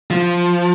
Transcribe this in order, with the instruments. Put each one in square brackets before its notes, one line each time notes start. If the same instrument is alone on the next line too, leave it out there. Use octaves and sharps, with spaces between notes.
[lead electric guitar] F3